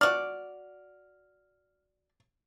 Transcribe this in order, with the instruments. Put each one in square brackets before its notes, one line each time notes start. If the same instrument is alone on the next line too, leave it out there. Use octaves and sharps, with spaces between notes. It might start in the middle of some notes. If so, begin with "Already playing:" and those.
[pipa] F#4 D5 [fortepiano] F6